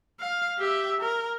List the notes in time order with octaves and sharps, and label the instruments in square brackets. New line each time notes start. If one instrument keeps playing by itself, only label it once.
[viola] F5
G4 E5
A#4